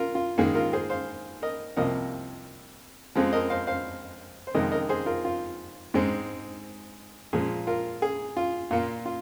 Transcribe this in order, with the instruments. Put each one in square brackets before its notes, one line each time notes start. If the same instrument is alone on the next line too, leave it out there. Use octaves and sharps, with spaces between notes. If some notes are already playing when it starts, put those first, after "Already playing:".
Already playing: [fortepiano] F4 A#4
F4
G#2 D#3 A#3 G#4
F4 A#4
G#4 C5
C5 F5
A#4 D#5
C2 C3 F3 A#3 A#4 D#5
F2 F3 G#3 C4
A#4 D#5
C5 F5
C5 F5
C5
F2 C3 D#3 G#3 A#4 D#5
A#4 D#5
G#4 C5
F4 A#4
F4
G#2 G#3 C4
A#2 F3 G#3 G#4
F4 A#4
G#4
F4
A#2 A#3 F4
F4